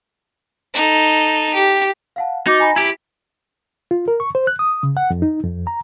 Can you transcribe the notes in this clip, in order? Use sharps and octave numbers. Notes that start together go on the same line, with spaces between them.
D#4 A4
G4
F5 F#5 A5
D#4 F#4 D6 A6
G#5 A#5 B5
E4 G4 B6
F4
A#4
C#6
C5
F#6
D#6
C#3
F#5
F2
D#4
F2
A#5